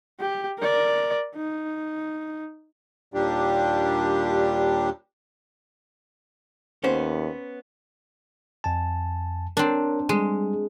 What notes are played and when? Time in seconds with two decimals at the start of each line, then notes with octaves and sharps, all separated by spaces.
0.20 G4
0.59 A#4 D5
1.36 D#4
3.14 D#2 A#2 G3 D4 G4
6.84 D#2 B3 C#4 C5
8.64 F2 G#5 A5
9.57 C4 D4 A#4 C#5 A#5
10.09 G3 G#3 G#4